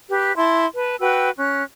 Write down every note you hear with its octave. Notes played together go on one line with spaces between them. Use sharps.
G4 B4
E4 A5 C6
B4 A5
F#4 B4 G5 E6
C#4 F#6